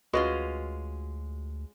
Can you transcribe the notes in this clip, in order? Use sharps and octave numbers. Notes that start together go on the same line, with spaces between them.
D2 G#3 C#4 F4 F#4 B4 D#5